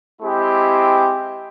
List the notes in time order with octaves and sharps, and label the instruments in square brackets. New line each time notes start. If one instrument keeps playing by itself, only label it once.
[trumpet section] G#3 C4 E4 G4